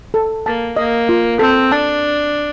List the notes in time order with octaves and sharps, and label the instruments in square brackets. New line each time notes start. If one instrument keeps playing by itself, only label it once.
[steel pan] A4
[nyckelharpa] A#3 [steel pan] A5
[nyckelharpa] A#3 [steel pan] D#5
[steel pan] F4
[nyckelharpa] C4 [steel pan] A4
[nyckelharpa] D4 [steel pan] A5